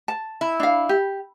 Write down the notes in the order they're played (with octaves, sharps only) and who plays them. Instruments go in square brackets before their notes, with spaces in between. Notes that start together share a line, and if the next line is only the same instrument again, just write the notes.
[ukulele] A5
[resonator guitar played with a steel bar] E4
[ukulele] D4 F5
G4